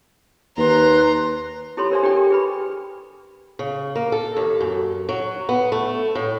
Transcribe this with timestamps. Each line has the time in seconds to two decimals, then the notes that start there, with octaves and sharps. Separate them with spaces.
0.57 D#2 B4 A#5 C6
1.77 E4 G4 A4 C#5 B5 C6
1.91 A#4 C5 D5 E5 G#5
2.03 D4 G4 A4 D5 G5
2.16 G4 A#4
2.30 G#4 B4 B5
3.59 C#3
3.95 A#3
4.12 A4
4.37 D#2
4.61 F#2
5.09 F#3
5.49 B3
5.72 A3
6.15 A2